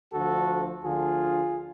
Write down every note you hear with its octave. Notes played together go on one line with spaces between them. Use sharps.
D2 D3 F3 F#4 A4
D2 D3 F3 F4 G#4